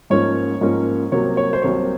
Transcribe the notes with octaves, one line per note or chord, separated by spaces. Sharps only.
G#2 F3 A#3 C#4 C#5
G#2 F3 A#3 C#4
C2 C3 F#3 A#3 C#5
C#5
C5
C2 C3 F#3 A#3 C#5